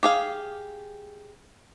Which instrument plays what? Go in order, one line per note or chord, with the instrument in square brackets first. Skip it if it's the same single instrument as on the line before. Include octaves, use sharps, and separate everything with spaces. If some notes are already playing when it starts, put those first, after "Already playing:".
[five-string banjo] G4 G#4 F5